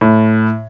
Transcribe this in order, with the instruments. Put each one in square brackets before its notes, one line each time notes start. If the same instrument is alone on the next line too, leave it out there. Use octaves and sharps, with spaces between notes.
[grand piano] A2